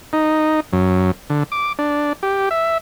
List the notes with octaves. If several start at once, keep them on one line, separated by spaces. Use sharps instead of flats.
D#4
F#2
D3
D6
D4
G4
E5